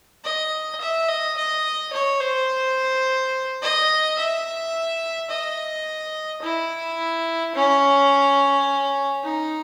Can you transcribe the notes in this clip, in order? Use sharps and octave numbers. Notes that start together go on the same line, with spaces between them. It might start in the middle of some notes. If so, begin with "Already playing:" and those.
D#5
E5
D#5
D#5
C#5
C5
D#5
E5
D#5
E4
C#4
D#4